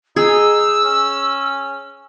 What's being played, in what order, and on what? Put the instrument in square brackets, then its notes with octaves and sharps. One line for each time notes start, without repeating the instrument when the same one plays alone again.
[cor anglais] D#4 [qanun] G#4 [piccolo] E6
[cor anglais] C#4